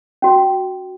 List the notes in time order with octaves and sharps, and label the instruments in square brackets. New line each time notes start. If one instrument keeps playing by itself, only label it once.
[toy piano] C#4 F#4